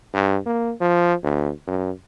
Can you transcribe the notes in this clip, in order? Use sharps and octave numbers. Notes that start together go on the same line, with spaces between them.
G2
A#3
F3
D2
F#2